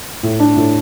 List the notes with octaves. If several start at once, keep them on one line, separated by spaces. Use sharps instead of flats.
A2
D4
A2